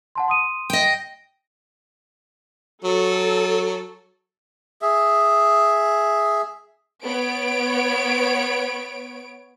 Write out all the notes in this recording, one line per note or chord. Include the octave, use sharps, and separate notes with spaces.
F#5 A5 C6
C6 D#6 D#7
D#5 G5
F#3 A4
G#4 E5
B3 C#5 D7